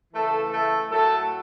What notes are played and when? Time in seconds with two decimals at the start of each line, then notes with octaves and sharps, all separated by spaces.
0.13 C#3 E3 A3 A4
0.51 A3 A4
0.89 A2 F#3 A3 A4